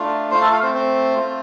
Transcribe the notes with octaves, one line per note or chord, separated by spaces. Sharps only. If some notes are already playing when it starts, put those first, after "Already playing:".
Already playing: A3 D4 F4
A3 F4 C5 C6
A4 A5
F4 F5
C4 C5
C4 C5
A3 C4 F4